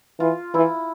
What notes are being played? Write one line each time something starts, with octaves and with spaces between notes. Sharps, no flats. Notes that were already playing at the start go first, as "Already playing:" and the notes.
E3 F4
E3 E4